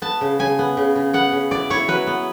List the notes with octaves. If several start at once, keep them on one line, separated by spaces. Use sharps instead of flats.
B3 A5
C#3
C#3 G#5
B3
C#3
C#3
B3 F#5
C#3
E4 D5
E4 C#5
F#3 B4
B3